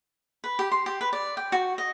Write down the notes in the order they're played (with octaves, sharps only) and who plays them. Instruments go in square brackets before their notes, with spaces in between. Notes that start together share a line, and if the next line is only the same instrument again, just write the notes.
[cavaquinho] B4
G4
C6
G4
B4
D5
G5
F#4
D#5